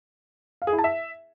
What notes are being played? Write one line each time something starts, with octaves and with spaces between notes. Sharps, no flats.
F5
G#4
E4
A5
E5